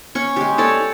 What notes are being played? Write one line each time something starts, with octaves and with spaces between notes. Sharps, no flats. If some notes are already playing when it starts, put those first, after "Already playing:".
C#4 C#6
G#3 G4
A4 C#5 D5